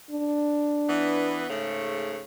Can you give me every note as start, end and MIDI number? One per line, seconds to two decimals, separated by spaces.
0.11 1.56 62
0.88 1.45 52
0.88 1.45 59
1.49 2.24 44
1.49 2.24 49
1.49 2.24 57